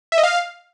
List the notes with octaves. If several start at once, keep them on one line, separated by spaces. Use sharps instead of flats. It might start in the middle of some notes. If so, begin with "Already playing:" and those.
E5
D#5
F5